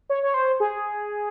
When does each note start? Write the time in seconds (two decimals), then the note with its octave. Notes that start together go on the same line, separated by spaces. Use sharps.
0.10 C#5
0.23 C#5
0.34 C5
0.60 G#4